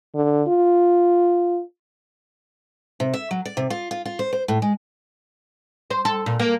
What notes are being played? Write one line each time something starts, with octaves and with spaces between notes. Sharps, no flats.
D3
F4
C3
E5
F#3
D5
C3
F4
F4
F4
C5
C5
A2
G#3
C5
A4
A#2
A#3